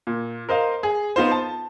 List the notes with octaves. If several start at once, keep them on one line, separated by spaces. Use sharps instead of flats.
A#2
A#4 C5 D#5 F5
G#4
B3 D#4 F4 C5
A5